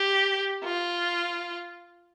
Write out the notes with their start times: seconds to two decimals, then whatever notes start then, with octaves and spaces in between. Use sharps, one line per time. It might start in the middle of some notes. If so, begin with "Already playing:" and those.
Already playing: G4
0.64 F4